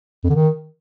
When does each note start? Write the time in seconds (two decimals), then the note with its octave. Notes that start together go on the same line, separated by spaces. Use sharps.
0.24 F2
0.29 D3
0.35 D#3